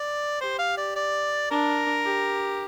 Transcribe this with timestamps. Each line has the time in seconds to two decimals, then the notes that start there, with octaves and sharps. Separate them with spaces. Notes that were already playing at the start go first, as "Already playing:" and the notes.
Already playing: D5
0.40 G4 C5
0.59 F5
0.77 D5
0.96 D5
1.50 D4 A#4
2.05 G4